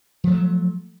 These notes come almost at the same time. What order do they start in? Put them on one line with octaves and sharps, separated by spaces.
F3 A3 F#3